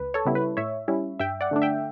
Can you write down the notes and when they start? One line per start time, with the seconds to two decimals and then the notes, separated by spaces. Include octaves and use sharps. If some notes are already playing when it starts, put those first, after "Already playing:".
Already playing: C#2 B4
0.14 A4 C#5
0.25 C#3 G3 B3 E4
0.35 B4
0.57 A2 C#5 E5
0.88 G3 C#4 E4
1.19 G2 E5 G5
1.41 D5 F#5
1.51 D3 A3 D4
1.62 E5 G5